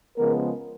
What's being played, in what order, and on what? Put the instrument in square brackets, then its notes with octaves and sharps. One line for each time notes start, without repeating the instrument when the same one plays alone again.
[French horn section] C#3 F3 G#3 B3 A#4